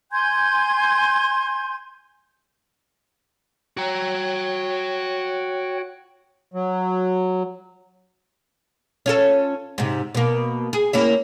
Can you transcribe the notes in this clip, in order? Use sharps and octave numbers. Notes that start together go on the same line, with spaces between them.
G#5 C6 G6 G#6
F#4 C#5 G5 A#5
F#3
C#4 F4 A4
G#2 C3
B2 A#3
G#4
A#3 C#4 E4